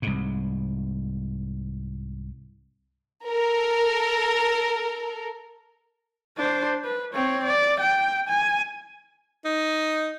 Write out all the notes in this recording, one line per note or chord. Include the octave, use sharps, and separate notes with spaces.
C2 G#2
A4 A#4
D4 C5
B4
C4 C#5
D5
G5
G#5
D#4